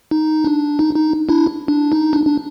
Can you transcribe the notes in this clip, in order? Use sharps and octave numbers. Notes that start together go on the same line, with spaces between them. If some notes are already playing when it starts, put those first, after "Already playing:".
D#4
D4
D#4
D#4
D4 E4
D4
D#4
D4
D4